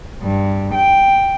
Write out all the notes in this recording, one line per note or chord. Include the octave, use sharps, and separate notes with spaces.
G2
G5